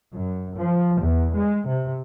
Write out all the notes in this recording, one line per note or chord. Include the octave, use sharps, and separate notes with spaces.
F#2
F3
E2
G#3
C3